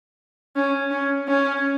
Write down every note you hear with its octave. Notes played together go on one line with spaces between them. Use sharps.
C#4
C#4
C#4